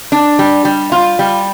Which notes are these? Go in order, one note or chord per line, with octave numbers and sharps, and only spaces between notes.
D4
G3
G3
F4
G3